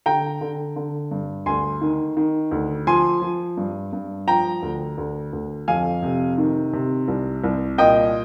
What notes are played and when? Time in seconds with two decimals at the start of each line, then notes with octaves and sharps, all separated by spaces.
0.06 D3 G5 A#5
0.41 D3
0.76 D3
1.11 G2
1.46 D2 G#5 C6
1.81 D#3
2.17 D#3
2.51 D2
2.87 F3 G#5 C6
3.22 F3
3.57 G2
3.93 G2
4.27 F3 G5 A#5
4.62 D2
4.98 D2
5.33 D2
5.68 F2 F5 G#5
6.03 C3
6.38 D#3
6.73 C3
7.08 C2
7.44 C2
7.78 A#2 D#5 G5